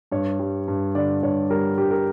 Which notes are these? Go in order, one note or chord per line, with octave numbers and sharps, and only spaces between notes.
G2 C#5
G3
G2
D3 D5
G2 C#5
G3 A#4
G2 G4
A#4